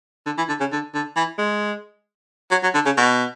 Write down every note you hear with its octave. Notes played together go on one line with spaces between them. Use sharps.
D3
E3
D3
C#3
D3
D3
E3
G#3
F#3
F#3
D3
C#3
B2